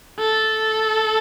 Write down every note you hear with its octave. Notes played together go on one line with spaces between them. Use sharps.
A4